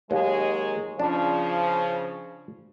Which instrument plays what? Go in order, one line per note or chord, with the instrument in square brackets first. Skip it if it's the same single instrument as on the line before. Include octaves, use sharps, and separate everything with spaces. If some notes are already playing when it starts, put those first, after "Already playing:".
[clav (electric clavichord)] D#2 [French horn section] F#3 G#3 G#4
[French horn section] C#3 F3 [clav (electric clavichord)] D4